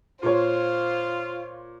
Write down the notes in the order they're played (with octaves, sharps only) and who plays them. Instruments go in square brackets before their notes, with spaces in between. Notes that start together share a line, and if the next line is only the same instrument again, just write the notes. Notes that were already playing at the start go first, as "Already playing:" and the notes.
[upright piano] A#2 C#5 [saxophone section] F4 [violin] C5